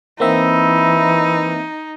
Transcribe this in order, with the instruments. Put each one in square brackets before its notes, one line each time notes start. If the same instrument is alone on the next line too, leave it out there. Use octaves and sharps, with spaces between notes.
[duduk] E3 [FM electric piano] A#3 C4 E5 [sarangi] D#4 [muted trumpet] E4